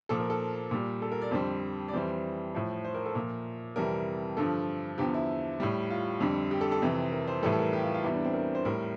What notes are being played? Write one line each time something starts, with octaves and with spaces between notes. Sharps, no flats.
A#2 F3 A4
A#4
A4
A#2 G3
A4
A#4
D5
F2 D3 G3 C5
D5
F2 E3 G3 C5
A2 F3
C5
A#4
A4
A#2 F3 A#4
F2 C3 E3 G3 A#4
G2 D3 F3 A4
E2 D3 F3 G4
E4
A2 G3
F4
F2 D3 G3
G4
A4
A4
F2 C3 E3
A#4
C5
A2 E3 G3 A4
A4
A#4
G4
F4
F4
E2 E3 G3 E4
D4
C4
A#4
C5
A2 G3 A#4